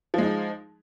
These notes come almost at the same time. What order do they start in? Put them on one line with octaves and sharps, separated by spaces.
F3 G#3 D#4